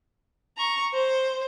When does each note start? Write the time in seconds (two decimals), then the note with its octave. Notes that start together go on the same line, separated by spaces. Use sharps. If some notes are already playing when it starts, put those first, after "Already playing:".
0.57 A#5 C#6
0.93 C5